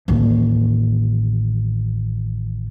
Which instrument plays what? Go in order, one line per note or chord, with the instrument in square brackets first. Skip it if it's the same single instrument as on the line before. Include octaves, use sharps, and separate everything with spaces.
[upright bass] A1 D#2